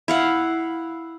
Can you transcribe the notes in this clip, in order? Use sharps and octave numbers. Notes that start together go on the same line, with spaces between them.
E4 F5 F#5